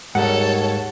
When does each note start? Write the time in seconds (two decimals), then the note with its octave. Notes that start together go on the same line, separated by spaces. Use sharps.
0.15 D#2 G#2 G3 A4 C#5 F#5